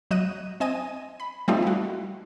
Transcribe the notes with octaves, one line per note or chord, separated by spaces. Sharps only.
F#3 D#5 F#6 D#7
C4 D#5 G#5 D#7
B5
F3 G3 A3 C4 D#4 F4
E4 F#4